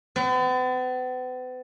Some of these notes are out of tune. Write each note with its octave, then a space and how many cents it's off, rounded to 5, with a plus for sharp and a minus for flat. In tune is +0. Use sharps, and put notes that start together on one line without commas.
B3 +45